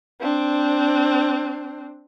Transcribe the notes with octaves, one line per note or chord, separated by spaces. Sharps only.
C4 D4